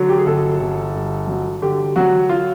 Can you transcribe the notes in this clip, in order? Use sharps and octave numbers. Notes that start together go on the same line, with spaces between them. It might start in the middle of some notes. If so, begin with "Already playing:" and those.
Already playing: D3 F#3
G4
G#4
G1 A4
G1
G2
F#3
D3 G4
F#3 F#4
F4